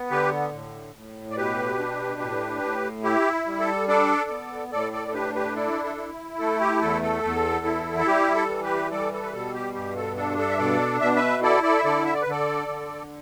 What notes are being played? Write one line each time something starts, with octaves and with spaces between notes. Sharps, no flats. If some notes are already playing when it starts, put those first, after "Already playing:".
Already playing: B3
D3 G4 B4
A2
A2
D5
B2 G4 B4
D4
A2
A2
E4 G4
G3
A4
D4 A4 D5
B3
A2 A4 D5
A4 D5
A4
D4 G4 B4
G4 B4
E4 A4 D5
A4
E4
A3 A4
G4
E2 A4
A4
E2
E4
A4
G3 G4
A4
E3
G4 B4
G3 A4 D5
A4
B4
B2 A4
G4
G2 G4
A4
D4 A4
A4
E5
B2 A4 D5
B2 E5
B4 E5
E4 A4 D5
A4 D5
E5
D3 A4 D5
E5
D5
B4
D3 A4 D5
D3